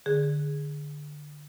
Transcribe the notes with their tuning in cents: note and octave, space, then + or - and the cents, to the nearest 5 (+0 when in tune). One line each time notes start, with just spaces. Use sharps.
D3 +10 G#4 -5